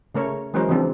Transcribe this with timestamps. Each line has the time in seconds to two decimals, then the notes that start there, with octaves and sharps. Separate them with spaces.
0.15 C#3 A3 A#4 C#5
0.54 E3 F#3 G#3 C#4 A#4 C5
0.69 C#3 E3 F3 C4 D4